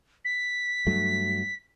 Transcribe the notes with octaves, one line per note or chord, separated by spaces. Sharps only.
B6
G2 F#3 A3